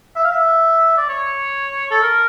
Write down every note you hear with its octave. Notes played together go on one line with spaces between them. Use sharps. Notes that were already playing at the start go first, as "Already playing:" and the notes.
E5
F5
E5
D5
C#5
A4
A#4